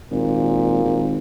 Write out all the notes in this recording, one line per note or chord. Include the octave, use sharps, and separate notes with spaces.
G#1 A#2
G#1